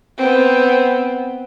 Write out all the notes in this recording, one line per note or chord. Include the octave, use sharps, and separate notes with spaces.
B3 C4